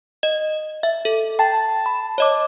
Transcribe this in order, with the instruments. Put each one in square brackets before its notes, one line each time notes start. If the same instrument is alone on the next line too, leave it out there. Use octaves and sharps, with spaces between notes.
[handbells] D#5
E5
A4
[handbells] G5 [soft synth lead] A5
[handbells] B5
C#5 D#5 D6